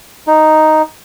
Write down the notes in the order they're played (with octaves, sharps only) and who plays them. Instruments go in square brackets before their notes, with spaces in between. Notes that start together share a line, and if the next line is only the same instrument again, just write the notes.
[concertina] D#4